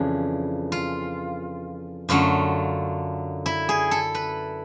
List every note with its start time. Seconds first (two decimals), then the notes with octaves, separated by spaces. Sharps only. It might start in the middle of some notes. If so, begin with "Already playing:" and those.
Already playing: F2 C#3 E3 D4
0.72 F4
2.09 F#2 D3 F#3 A3 F4
3.46 E4
3.69 G#4
3.91 A4
4.15 B4